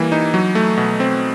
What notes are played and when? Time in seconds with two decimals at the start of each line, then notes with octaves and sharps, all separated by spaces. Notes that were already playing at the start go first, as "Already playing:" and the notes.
Already playing: E3 G3 A#3
0.12 D#4
0.34 F#3
0.55 A3
0.77 B2
1.00 C4